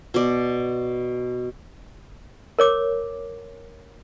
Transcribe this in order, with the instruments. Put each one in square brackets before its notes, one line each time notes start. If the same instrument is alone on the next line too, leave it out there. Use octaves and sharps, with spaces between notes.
[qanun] B2 D5
[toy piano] A#4 C#5 D6